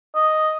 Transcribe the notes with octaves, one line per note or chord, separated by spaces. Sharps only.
D#5